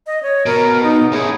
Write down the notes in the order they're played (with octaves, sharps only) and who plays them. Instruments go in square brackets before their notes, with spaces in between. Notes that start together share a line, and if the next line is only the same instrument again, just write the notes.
[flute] D#5
C#5
[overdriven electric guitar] B2 [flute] A#4
[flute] D#4
[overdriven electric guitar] C#4 E4 [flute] G#4